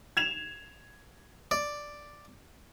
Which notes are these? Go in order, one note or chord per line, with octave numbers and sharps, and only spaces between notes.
G#6 E7 F7
D5